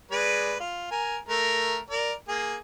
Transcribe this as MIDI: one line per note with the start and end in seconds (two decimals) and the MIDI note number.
0.11 0.56 56
0.11 0.56 71
0.11 0.56 74
0.60 0.87 65
0.91 1.17 70
0.91 1.17 80
1.29 1.78 57
1.29 1.78 70
1.90 2.13 70
1.90 2.13 74
2.28 2.56 58
2.28 2.56 68